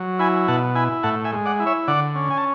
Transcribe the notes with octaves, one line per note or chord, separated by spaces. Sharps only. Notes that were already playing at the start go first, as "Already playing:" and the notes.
Already playing: F#3
E4 G#5 B5
B2 F#5 A5
E4 G#5 B5
A2 F#5 A5
E5 G#5
G#3
D5 F#5
E4
C#5 E5
D3 D5 F#5
C#4
G#5
A5